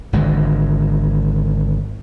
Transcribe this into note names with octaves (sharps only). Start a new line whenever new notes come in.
G#1 D3 G#3